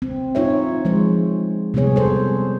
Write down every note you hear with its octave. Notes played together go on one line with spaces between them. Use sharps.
C4
D#4 F4 C#5 E5
F3 G#3 C5
C3 G3 B3 G#4 C#5
A4 C5